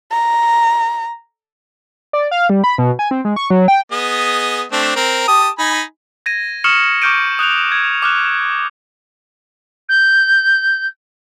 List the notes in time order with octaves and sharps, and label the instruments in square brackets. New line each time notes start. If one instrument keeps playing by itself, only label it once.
[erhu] A#5
[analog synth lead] D5
F5
G3
B5
B2
G#5
C4
G#3
C#6
F#3
G5
[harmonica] B3 G#4 D#5
A3 C4 D4
C4 A#4
G4 A5 D#6
D#4 G#5 B5
[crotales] G#6 A#6 D#7
C#6 D#6 F6 C#7 E7 F#7
C#6 D6 F6 G6 D7 D#7
D#6 F#6 G6 F7
G#6
D6 F6 F#6
[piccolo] G6